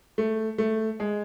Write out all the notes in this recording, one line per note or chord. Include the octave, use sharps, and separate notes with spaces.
A3
A3
G#3